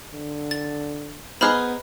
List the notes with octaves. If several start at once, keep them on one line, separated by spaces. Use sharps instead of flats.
D3
A6
B3 D#4 G#4 C5 B5 F6 F#6